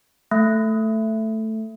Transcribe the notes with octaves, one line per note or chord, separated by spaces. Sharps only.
A3